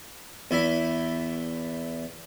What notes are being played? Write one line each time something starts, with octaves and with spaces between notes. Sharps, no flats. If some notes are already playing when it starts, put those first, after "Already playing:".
E2 E4